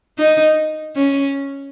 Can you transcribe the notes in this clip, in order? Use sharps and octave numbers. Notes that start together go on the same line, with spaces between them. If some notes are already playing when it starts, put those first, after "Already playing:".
D#4
C#4